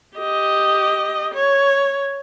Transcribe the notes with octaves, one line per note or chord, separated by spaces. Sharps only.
G4 D#5
C#5